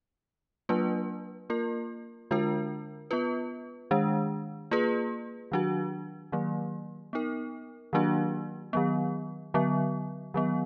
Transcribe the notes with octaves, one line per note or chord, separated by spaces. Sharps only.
F#3 A#3 D4 F4 B4
A#3 F4 A#4
D3 G#3 D4 F4 A#4
B3 F4 B4
D#3 G#3 D4
A#3 F4 G#4 B4
D#3 F#3 D4 F#4
D#3 F#3 A#3
B3 D#4 A#4
D#3 F#3 A#3 D4 F#4
D#3 F#3 B3
D3 F#3 B3
D#3 F#3 B3